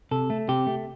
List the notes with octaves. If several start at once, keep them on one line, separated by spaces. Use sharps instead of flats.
C3 A4
A3
C3 G4
A3